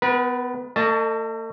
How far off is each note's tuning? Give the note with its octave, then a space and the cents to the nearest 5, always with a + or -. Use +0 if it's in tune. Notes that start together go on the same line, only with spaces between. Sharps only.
B3 +20 B4 -40
A3 +40 D#5 -20 A5 +0